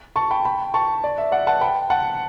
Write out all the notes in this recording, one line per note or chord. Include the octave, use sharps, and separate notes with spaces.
A5 C#6
G5 B5
G5 B5
A5 C#6
D5
E5
D5 F#5
F#5 A5
G5 B5
F#5 A5